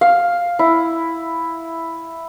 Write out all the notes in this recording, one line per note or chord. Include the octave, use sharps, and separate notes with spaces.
F5
E4